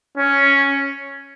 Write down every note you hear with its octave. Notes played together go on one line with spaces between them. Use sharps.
C#4